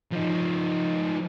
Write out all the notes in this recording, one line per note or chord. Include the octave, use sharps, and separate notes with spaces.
F3 D#4